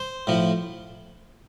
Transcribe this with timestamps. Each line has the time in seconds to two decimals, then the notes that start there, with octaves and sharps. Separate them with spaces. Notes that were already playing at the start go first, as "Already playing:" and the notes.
Already playing: C5
0.27 A2 F3